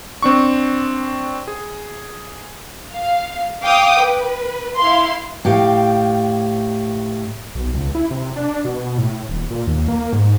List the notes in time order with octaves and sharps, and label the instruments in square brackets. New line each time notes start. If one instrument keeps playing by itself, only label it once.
[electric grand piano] C4 D4 C#6
G#4
[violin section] F5
F5 G5 D6 D#6
B4
E4 F5 C6
[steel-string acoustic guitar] A2 G4 F5
[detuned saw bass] B1
C#2
E4
C3
D4
B2
A2
D#1
A#2
D#2
A#3
G#2